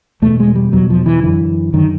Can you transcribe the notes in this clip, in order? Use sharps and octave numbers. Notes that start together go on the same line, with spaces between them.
E2 B2 A3
G#3
G3
E2 B2 F#3
F3
E3
F#2 D3 E3
F#2 D3 D#3